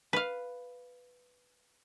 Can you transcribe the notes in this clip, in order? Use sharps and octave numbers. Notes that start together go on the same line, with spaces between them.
B4 F5